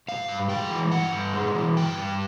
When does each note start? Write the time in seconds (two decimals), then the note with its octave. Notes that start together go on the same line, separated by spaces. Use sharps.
0.08 G2 F5
0.28 G2
0.49 G#3 G5
0.70 E3
0.91 G2 F#5
1.12 G2
1.33 G#3
1.55 E3
1.76 G2 G5
1.98 G2